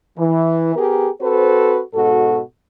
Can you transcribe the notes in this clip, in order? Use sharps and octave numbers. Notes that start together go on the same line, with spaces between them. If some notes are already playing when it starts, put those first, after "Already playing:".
E3
B3 G4 G#4 A#4
C4 F#4 A4 B4 C5
G#2 B2 F#4 A4